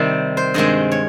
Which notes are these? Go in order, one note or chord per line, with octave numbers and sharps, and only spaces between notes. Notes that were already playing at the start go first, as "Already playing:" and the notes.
Already playing: C3 D#3 G3 C4
C5
G2 D#3 G#3 C4 D#5
C#5